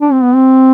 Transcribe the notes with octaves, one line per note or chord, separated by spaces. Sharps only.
D4
C4
B3
C4